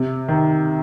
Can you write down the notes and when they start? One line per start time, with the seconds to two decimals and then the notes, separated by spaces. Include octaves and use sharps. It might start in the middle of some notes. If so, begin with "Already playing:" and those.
Already playing: C3
0.28 D#3